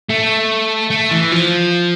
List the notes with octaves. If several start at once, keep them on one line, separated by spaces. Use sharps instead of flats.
A3
A3
E3
F3